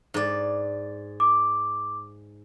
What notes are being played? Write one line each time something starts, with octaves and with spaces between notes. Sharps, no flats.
G#2 D5
D6